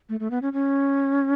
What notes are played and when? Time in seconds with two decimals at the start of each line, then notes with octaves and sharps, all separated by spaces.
0.09 A3
0.20 A3
0.31 B3
0.42 C#4
0.53 C#4